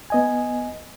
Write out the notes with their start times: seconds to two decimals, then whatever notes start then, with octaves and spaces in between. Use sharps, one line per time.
0.10 B3 D#5 G#5